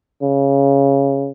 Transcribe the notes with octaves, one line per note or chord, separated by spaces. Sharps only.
C#3